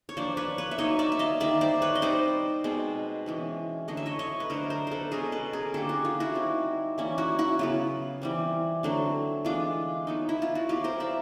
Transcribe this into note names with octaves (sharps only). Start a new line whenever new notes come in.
C#5
F3 A#3 D4 C5 D5
B4 C#5
B4 C#5
E5
F#3 A#3 D#4 C#5 D#5
D5 E5
E5
D#5 F5
D#3 G3 A#3 D5 E5
C5 D5
B4 C#5
D#5
G3 C4 D#4 C5 D5
B2 G#3 C4
E3 G#3 C#4
D3 F#3 A3 D#5
E5
C#5 D#5
C#5 D#5
B4
D3 F#3 A3 A#4 C5
A#4 C5
A4 B4 C5
B2 G#3 C#4 G#4 A#4
A4 B4
G#4 A#4
D3 F#3 A#3 C#4 G4 A4
F#4 G#4
F4
E4 F#4
G3 C4 D#4
E3 G3 A#3 C#4
E4 F#4
E4 F#4
C#3 F#3 B3 F4
E3 G3 C4
D3 F#3 A3 C4
E3 G#3 B3 D4 F4
F#3 B3 D#4
E4
F4
F#4
F#3 B3 E4 F4 G4
A#4 C5
D5 E5